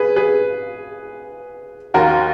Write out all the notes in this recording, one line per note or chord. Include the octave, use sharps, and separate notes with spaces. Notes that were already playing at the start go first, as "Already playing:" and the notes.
Already playing: G#4 B4
G#4 B4
D#2 D#3 A#3 F#4 A#4